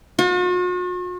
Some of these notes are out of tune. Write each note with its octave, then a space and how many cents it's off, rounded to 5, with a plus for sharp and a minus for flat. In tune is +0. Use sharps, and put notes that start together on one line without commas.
F#4 -45